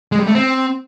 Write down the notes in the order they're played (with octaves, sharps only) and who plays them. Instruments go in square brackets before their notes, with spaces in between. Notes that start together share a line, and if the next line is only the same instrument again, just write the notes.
[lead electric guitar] G#3
G3
A3
C4